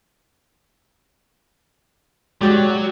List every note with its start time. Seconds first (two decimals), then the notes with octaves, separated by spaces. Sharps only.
2.41 F#3 G#3 F#4 G4 D5